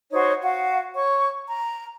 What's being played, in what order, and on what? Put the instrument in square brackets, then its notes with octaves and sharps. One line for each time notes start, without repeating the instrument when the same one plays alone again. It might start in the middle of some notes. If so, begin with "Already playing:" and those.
[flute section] D#4 F#4 C5 C#5
F#4 F5 F#5
C#5 C#6
A#5